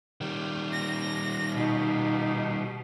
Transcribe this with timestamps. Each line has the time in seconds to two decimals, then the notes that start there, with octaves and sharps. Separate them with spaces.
0.21 D#3 G3
0.73 A#6
1.56 B2 D#4